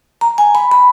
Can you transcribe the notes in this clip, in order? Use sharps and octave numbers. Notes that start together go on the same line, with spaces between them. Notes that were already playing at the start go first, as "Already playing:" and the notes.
A#5
G#5
B5
B5